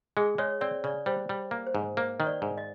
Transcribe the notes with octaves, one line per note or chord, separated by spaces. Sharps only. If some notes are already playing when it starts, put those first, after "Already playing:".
G#3 G#4
G#3 C#5
C4 D5
C#3 D5
G3 C5
G3
A#3
C5
G#2
A#3 C5
D#3
D5
G#2
D#5